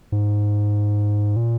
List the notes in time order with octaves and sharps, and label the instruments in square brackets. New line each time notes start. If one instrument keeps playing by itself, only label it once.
[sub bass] G#2
A#2